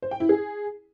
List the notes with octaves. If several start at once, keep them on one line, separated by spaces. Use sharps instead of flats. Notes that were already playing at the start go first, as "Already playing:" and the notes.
C5
G5
E4
G#4